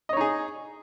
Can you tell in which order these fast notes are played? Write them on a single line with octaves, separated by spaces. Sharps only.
D#5 C#5 D#4 G#4